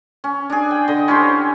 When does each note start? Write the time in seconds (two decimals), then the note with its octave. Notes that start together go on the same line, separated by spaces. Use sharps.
0.24 C#4
0.50 D4 G#4
0.71 G5
0.88 D3 D#5
1.08 C#4 E4 G4 C5